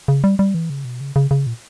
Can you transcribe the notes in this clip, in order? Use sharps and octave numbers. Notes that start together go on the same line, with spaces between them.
C#3
G3
G3
E3
C#3
B2
C#3
C#3
C#3
A#2